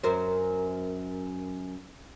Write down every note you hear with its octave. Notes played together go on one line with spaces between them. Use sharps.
F#2 A#4 C5